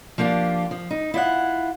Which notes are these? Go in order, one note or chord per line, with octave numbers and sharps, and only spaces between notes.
F3 A#3 D4 F4 G4
F3
D#4
E4 F4 D5 F#5